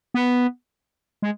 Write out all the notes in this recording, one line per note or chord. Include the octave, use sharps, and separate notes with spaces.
B3
G#3